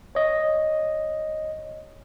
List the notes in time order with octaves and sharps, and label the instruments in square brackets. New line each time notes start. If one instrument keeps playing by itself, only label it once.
[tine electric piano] C#5 D#5